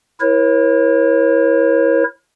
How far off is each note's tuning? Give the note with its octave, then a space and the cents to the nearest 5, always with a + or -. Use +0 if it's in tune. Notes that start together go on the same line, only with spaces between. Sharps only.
E4 +0 A#4 +35 C#5 -35